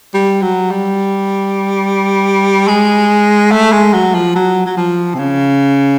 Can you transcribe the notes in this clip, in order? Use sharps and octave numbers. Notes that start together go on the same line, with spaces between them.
G3
F#3
G3
G#3
A3
G#3
F#3
F3
F#3
F#3
F3
C3
C#3